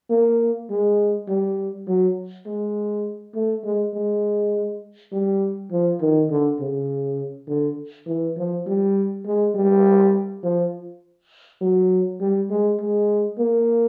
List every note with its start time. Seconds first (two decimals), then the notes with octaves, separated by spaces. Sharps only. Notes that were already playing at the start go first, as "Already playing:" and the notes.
0.10 A#3
0.70 G#3
1.28 G3
1.88 F#3
2.46 G#3
3.35 A3
3.64 G#3
3.94 G#3
5.12 G3
5.72 F3
6.01 D#3
6.31 D3
6.60 C#3
7.48 D3
8.07 E3
8.37 F3
8.66 G3
9.25 G#3
9.55 G3
10.44 F3
11.61 F#3
12.21 G3
12.50 G#3
12.80 G#3
13.38 A#3